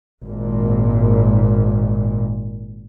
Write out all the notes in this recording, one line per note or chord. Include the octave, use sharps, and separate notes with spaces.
G#1 A#2